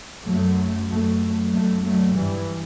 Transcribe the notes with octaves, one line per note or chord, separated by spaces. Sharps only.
F#2 F#3 A3
F#2 F#3 A3
F#2 F#3 A3
F#3 A3
G2 E3 G3